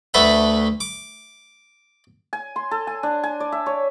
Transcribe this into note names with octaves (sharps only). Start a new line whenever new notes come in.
D2 A3 A4 B4 E5 F#5
D6
G#5
C6
A4
G#5
D4
G#5
D5
E5
C#5